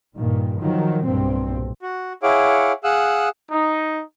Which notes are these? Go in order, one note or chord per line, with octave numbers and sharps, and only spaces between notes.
G2 A#2 D#3
D#3 F3 F#3
B1 G2 A#2 C4
F#4
E4 G#4 C#5 F5 F#5 D6
G#4 F5 F#5 D#6 E6 F#6
D#4